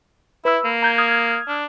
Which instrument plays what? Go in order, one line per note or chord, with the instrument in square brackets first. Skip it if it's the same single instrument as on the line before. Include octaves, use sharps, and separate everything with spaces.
[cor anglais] E4 [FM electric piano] B4 B5 E6
[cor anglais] A#3
[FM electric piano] A#5 G6 G#6
D#6 F6 G#6
[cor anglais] D4